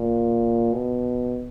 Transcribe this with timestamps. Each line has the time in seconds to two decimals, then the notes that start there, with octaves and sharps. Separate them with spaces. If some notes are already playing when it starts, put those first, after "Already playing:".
Already playing: A#2
0.72 B2